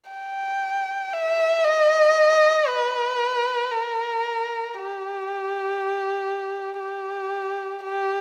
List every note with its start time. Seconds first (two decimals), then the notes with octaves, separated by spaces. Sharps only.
0.11 G5
1.13 E5
1.65 D#5
2.68 B4
3.71 A#4
4.74 G4
6.80 G4
7.83 G4